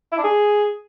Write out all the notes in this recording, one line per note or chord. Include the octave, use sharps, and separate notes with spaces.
E4
D4
G#4